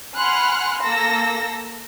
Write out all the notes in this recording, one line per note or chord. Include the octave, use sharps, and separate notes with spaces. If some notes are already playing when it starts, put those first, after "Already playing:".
F#5 G#5 B5 C6 F6 F#6
A#3 A4 E6 A#6